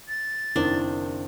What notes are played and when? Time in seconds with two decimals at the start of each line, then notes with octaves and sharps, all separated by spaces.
0.08 A6
0.56 F#1 D#3 C4 D4 E4